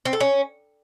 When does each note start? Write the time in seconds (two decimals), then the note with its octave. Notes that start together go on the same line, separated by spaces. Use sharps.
0.05 C4
0.13 A4
0.20 C#4